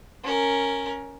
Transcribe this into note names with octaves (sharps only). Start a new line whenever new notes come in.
C#4 A#4